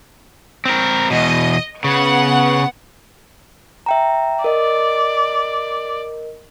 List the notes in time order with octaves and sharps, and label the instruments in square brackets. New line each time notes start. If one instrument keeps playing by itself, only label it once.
[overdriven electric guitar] C4 A#4
[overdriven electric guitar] E2 B2 [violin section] D#5
[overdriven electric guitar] C#3 [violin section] B3 F#5
[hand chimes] E5 G5 A#5
[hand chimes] A#4 D#5 [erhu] D5